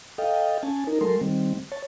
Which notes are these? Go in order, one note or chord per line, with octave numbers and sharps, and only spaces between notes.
A4 D#5 F5 G5
C#4 G#5 A5
D#4 A#4
F#3 G#3 A4 A#4 C6
D#3 G3 C4
C#5 A5